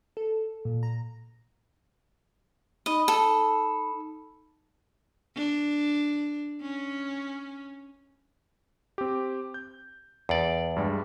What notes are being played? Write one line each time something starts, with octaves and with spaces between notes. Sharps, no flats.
A4
A#2
A#5
D#4 D#5 B5
A4
D4
C#4
C4 G4
G6
E2 D5
G2 G3 G#3